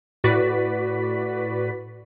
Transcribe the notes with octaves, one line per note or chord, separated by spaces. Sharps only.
A2 F#4 B4 D5 B6